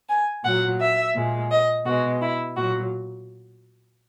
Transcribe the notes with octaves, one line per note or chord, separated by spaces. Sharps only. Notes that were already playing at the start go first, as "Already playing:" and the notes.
G#5
A#2 F#3 F#5
E5
A#2 G#3
D#5
B2 G#3 F#4
E4
A#2 F#3 F#4